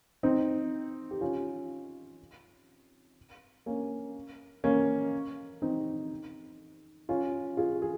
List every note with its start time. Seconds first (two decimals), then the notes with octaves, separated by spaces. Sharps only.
0.23 C4 D#4
1.11 G4
1.21 C#4 F4
3.66 A#3 C#4
4.64 A#3 C#4
5.62 C4 D#4
7.09 C#4 F4
7.57 F4 G#4
7.82 G#4